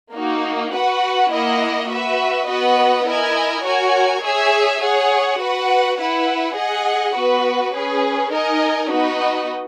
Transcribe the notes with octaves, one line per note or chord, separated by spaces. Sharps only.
A#3 D#4 F#4
F#4 B4 F#5
A#3 E4 A#4 D#5 F#5
F#4 B4 E5
B3 F#4 B4 D#5 F#5
E4 A#4 D#5 G#5
F#4 A#4 C#5 G#5
G#4 C#5 E5 G#5
G#4 C#5 F#5
F#4 B4 F#5
E4 B4 F#5
G#4 D#5 F#5
B3 F#4 B4
C#4 G#4 B4
D#4 A#4 D#5 G#5
B3 D#4 F#4 B4 D#5